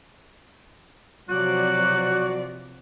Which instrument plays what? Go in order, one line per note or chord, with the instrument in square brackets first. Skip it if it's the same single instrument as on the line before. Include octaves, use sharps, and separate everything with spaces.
[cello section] C3 F3 D5 [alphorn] F#3 [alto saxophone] F#4 [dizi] F#6